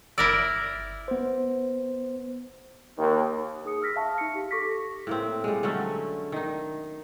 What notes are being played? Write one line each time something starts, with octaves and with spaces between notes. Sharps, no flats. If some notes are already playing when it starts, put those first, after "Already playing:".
G1 E4 A#4 D5 E6
B3 C5
D#2
D#4 G#4 D#6 C#7
E6 F6 A#6 B6
E5 F5 A5 C#6 F6
D#4 C#7
G4
G4 A4 C#6 D6 A#6 B6
A2 A#3 C4
G3 G#3
D3 F#3 A3 C#4
D#3 D#4